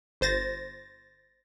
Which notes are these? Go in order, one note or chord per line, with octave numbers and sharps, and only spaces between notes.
G1 C5 A6 A#6